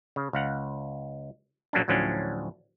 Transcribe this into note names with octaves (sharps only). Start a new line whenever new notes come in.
C#3
C#2 F5 F#5
A#1 F#3 A#3 C#4 D4
D2 A2 F3 F#3 C#4 D4